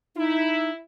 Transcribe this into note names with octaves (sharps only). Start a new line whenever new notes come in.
D#4 E4